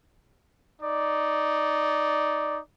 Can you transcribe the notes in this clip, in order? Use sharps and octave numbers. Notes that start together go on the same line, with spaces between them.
D#4 D5